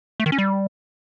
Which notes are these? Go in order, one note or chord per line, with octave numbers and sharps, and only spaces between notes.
A3
D#3
C#4
G3